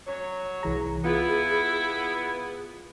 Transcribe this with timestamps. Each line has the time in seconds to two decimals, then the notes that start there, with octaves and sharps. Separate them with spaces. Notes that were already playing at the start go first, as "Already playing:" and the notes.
0.07 F#3 C#5
0.63 C2 E3 G#4 A#5
1.05 B3 E4 F4